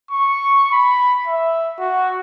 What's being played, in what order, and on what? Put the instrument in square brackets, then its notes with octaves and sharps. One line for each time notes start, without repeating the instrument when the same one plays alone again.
[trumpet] C#6
B5
E5
F#4